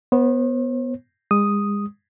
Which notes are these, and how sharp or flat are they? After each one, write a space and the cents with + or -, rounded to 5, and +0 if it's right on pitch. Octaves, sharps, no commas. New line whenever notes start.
B3 -5 C5 +45
G#3 -35 D#6 +0